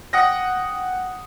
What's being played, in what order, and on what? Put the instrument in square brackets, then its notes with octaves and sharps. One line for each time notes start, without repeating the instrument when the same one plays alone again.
[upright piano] F#5 G5 D#6 A#6